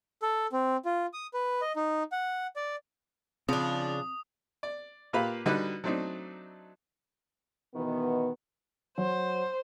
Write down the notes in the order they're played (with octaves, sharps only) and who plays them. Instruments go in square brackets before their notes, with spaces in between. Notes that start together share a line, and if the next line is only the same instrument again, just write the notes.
[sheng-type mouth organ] A4
C4
F4
D#6
B4
D#5
D#4
F#5
D5
[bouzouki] C#3 D4 [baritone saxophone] F3 [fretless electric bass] C4 [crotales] D#6
[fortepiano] D5
A#2 A#3 G4 B4 F5 B5
D3 G3 D#4 F#4 B4
F#3 A3 C4 D4 D#4
[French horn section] B2 D#3 E3 B3
[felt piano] F#3 [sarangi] C5